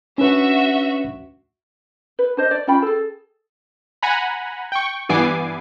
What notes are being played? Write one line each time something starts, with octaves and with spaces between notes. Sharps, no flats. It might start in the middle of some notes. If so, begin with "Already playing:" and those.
C#4 D4 F#4 B4 E5
B4
D4 C5 D#5
D5
C#4 F4 G5 B5
G#4 A4
F#5 G#5 A#5 B5
G5 C#6
G2 E3 B3 G#5 D6 C7